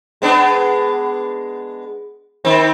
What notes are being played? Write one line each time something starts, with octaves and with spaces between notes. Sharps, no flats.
G#3 B3 D4
D#3 C4